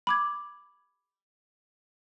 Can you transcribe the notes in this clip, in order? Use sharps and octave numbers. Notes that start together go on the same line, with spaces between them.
B5 D6 G#6